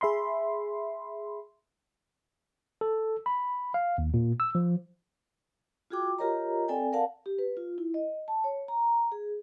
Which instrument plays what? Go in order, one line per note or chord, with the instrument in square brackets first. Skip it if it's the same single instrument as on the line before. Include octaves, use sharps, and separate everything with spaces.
[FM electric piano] G#4 E5 B5 C6
[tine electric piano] A4
B5
F5
D#2
A#2
E6
F3
[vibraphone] F4 F#4 G#4 G5 D6
F4 G4 A#4 C#5 D#5 A#5
C4 A4 D5 G5 G#5
A#4 D5 F5 F#5 A5
G4
B4
F4
E4
D#5
A5
C#5
A#5
G#4